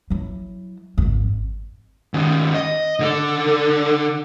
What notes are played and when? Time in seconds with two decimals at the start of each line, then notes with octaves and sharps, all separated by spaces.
0.10 F#3 E4
0.98 G#1 F2
2.14 D#3 C#4
2.54 D#5
3.00 D3 A4